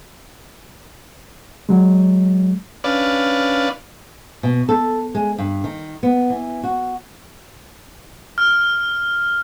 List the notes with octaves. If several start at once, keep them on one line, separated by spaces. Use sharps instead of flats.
F#3 G#3
C#4 D4 B4 D5 F5
B2
A4
G#3
G2
D#3
B3
E3
F#4
F6